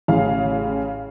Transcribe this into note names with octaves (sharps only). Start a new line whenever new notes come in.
A1 C#3 F5